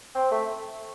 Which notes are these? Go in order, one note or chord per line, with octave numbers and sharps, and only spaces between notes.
C4
A3